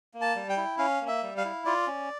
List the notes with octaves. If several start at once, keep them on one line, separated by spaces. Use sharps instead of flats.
A#3
A5
G3
G5
E4
C#4 F5
A#3
E5
G3
F5
E4
F4 D5
C#4